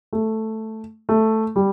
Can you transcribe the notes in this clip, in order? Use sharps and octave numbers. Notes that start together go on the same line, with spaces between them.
A3
A3
G3